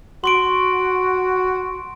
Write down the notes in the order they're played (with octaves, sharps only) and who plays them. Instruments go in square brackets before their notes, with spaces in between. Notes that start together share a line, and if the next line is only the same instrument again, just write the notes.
[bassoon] F#4 [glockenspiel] C6 C#6 D7